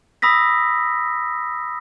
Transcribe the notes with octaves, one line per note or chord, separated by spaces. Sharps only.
B5 D#6 E6 A#6 B6